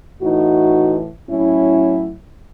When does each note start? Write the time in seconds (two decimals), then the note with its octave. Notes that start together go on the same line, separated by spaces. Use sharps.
0.21 A2 E3 D#4 F#4
1.29 A2 F#3 C#4 E4